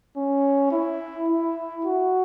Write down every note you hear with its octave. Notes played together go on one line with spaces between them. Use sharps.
C#4
E4
E4
F#4